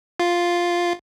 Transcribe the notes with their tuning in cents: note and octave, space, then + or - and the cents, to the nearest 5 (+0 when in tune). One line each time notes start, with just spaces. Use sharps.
F4 +0